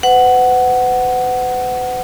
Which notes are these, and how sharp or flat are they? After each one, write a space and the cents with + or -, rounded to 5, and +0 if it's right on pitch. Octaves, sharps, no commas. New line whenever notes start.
B4 +40 F#5 +5